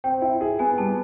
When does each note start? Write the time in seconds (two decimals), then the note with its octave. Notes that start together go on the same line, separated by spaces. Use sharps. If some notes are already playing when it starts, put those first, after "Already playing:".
0.04 C4 G5
0.22 E4
0.41 G#4
0.59 B3 G#5
0.78 G3 A5